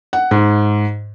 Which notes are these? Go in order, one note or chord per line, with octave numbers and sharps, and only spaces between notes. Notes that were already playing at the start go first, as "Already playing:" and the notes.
F#5
G#2